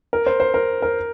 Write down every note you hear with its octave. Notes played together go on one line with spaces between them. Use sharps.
A#4
C5
C5
A#4
A#4